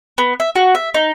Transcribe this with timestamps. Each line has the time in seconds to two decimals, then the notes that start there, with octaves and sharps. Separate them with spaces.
0.18 B3
0.40 E5
0.56 F#4
0.75 E5
0.94 D#4